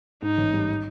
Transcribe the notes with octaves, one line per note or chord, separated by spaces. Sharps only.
G#2 D#4
A1
G3
D#3